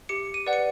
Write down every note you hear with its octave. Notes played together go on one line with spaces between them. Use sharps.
G4 C#7
D#7
B4 D5 F#5
C#7